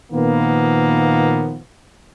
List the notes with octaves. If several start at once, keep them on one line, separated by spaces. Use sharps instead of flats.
A#2 D#3 F3 A#3 B3